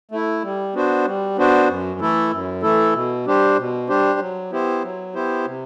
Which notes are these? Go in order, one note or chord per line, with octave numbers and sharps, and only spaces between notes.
A3 E4
G3
B3 D4 F#4 C5
G3
B3 D4 F#4 C5
F#2
E3 A3 E4 A4
F#2
E3 A3 E4 A4
B2
G3 D4 G4 C5
B2
G3 D4 G4 C5
F#3
B3 E4 G4 C5
F#3
B3 E4 G4 C5
C3